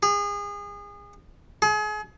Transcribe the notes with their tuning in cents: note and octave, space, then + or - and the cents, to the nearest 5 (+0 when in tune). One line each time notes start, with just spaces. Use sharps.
G#4 -30
G#4 +35